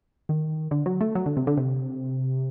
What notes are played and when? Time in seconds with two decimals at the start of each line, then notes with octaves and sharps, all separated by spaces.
0.29 D#3
0.71 D3
0.86 F#3
1.01 A3
1.15 F#3
1.26 D3
1.37 C3
1.47 D3
1.57 C3